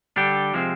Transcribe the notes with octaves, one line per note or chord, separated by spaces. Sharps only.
D3 G3 D4 G4
C3 F3 G#3 C4